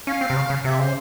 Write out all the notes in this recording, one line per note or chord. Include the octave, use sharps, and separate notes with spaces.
C#4 F5
C4
C3
C#3
C#3
C3 E5
C#3 C5